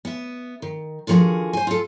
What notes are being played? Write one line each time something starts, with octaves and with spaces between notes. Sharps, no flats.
B3 E5
D#3
D3 D#3 F3 B3 F#4 G#4
C5 G#5
F4 A4